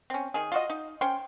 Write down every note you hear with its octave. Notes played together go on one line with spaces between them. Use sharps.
C4 C#4
D#3 G#4
F4 F#4 D#5
D#4
C#4 C5 G5 C6